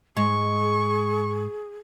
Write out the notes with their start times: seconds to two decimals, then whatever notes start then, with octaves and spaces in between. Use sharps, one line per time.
0.17 G#2 G#3 G#4 C#6